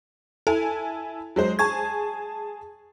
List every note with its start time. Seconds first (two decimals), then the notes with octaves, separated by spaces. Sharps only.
0.47 E4 A4 G#5 A5
1.36 F#3 G#3 C5
1.59 G#4 G#5 A5 C#6 G#6